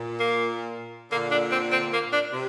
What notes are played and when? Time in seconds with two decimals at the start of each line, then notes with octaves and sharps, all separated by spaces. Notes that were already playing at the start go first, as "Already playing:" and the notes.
Already playing: A#2
0.20 A#3
1.11 A#2 D3 A#3
1.31 D4
1.51 C4
1.72 C4
1.93 A#3
2.13 D4
2.33 C3